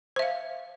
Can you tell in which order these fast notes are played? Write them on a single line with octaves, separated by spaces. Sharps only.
C5 E5 F5